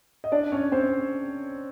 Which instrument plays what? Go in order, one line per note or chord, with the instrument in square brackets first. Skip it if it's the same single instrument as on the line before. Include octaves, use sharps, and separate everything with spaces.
[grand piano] D#5
D4 D5
C#4 C#5
C4 C5